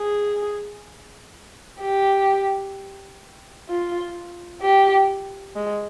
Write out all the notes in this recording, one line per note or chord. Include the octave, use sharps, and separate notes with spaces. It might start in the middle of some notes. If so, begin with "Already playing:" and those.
Already playing: G#4
G4
F4
G4
G#3